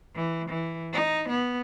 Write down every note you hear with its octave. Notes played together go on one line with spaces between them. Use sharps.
E3
E3
D#4
B3